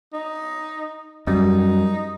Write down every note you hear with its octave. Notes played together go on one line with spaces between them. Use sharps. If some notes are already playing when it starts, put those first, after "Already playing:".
D#4
F#2 G3 D#4